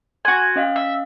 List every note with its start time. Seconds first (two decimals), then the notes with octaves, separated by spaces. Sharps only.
0.25 F#4 G#5 C6 F#6
0.56 C#4 D#5 F5
0.76 E5